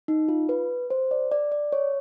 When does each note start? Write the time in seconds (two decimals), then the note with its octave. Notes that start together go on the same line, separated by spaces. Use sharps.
0.08 D#4
0.28 F4
0.49 B4
0.90 C5
1.11 D5
1.32 D5
1.52 D5
1.72 C#5